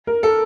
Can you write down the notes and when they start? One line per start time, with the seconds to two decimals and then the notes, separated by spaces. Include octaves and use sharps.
0.07 A#4
0.23 A4